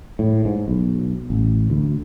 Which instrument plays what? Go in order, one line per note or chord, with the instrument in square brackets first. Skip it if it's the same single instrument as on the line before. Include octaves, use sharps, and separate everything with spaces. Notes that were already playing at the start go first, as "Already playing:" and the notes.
[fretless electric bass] A2
G#2
B1
A1
D2